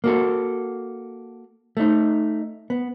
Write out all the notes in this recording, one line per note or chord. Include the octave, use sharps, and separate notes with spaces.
A#3 F#4 A4
A3 D#4
B3